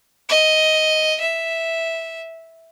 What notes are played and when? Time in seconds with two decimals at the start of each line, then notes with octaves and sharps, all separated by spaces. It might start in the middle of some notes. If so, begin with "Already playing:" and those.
0.29 D#5
1.20 E5